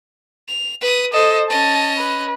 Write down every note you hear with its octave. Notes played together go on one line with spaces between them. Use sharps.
F7
B4 D#6
A4 C5 D#5
C#4 D#5 A5
B4